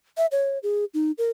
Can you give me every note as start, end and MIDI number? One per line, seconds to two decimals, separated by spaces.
0.17 0.26 76
0.32 0.59 73
0.63 0.85 68
0.94 1.12 63
1.18 1.31 70